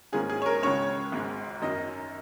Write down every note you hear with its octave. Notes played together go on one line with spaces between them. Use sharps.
G#2 D#3 A#3 C#4 G#4
G#4
C#5
A#4
C#2 C#3 G#3 C#4 C#5
G#1 G#2 G#3
F#2 D#3 F#3 C#4 D#5